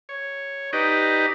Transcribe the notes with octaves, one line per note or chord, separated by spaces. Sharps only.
C#5
D#4 G4 B4 D5 D#5